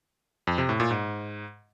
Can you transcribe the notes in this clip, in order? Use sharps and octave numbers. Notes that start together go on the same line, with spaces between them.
F2
C3
A2
A#2
G#2